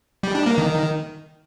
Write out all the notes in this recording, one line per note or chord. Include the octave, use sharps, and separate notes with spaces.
G3
D4
A#3
D#3